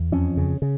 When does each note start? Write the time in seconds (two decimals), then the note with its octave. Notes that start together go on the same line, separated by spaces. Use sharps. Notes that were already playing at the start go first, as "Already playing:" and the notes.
Already playing: E2
0.12 F2 C#4
0.37 C#3
0.62 C#3